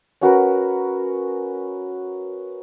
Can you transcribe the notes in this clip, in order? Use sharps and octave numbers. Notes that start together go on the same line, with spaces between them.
C#4 F#4 A#4 B4